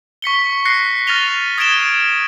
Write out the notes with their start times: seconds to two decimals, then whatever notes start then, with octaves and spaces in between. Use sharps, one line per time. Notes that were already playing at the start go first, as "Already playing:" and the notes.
0.22 C#6 B6 C#7 G7
0.65 F#6 A#6 C7 C#7
1.07 F6 A6 A#6 D#7 F7 G7
1.58 D#6 G#6 A6 D7 E7 G7